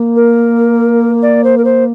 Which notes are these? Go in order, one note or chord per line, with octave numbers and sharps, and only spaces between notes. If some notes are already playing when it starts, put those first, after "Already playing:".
Already playing: A#3
A#4
D5
C5
A#4
C5